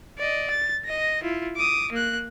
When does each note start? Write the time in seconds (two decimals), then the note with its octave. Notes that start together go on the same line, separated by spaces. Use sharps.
0.18 D5 D#5
0.50 A6
0.85 D#5 A#6
1.23 E4 F4
1.56 D6 D#6
1.92 A#3 F#6